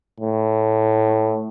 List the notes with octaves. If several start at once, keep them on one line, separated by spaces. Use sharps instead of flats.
A2